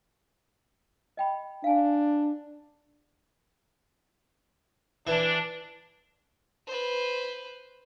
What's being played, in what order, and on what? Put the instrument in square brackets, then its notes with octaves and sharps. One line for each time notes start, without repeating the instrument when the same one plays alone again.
[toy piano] D#5 G5 B5
[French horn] D4 [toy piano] F5 G#5
[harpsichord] E3 [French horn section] D4
[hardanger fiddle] B4 C5